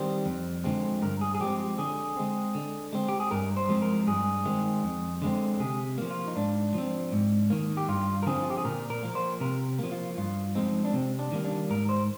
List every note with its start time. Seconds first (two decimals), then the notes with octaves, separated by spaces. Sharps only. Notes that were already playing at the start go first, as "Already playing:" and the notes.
Already playing: D#3 G3 C4 C5
0.26 F2
0.64 D3 F3 G#3 C4
1.02 G2 A#4
1.21 G#4
1.35 G#4
1.40 F3 G#3 C4 G4
1.60 G4
1.78 D3 G#4
2.17 G#3 C4
2.55 D3
2.93 G#3 C4
3.09 G4
3.20 G#4
3.31 G2 A#4
3.57 C5
3.69 F3 G#3 C4
3.82 A#4
4.07 G2 G#4
4.45 D#3 G#3 C4
4.84 F2
5.22 D3 G#3 C4
5.60 C3 G#4
5.98 F3 A#3
6.10 F4
6.28 D#4
6.36 G#2 D4
6.74 F3 C4
7.12 G#2
7.50 D#3 A#3
7.77 G4
7.88 G2 F4
8.23 A#4
8.26 D3 F3 C4 G#4
8.42 F4
8.50 G4
8.58 G#4
8.65 A#2 A#4
8.90 A#4
9.03 F3 A#3
9.15 C5
9.40 C3 A#4
9.79 F3 A#3
9.92 F4
10.17 G2 F4
10.55 F3 G#3 C4 D#4
10.85 D4
10.93 C3 C4
11.19 D4
11.32 D#3 G3 A#3
11.45 D4
11.70 G#2 A#4
11.89 C5